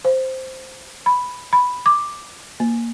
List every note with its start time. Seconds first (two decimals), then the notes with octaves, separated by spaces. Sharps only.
0.05 C5
1.06 B5
1.53 B5
1.86 D6
2.60 A#3